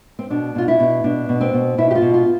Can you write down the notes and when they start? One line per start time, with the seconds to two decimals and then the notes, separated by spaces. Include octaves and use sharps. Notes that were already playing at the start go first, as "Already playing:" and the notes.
0.19 C4
0.30 B2 D4
0.55 B2 F4
0.68 E4
0.80 B2
1.04 B2 D4
1.29 B2
1.41 C4
1.54 B2
1.78 B2 E4
1.91 G4
1.95 F4
2.02 B2
2.14 F4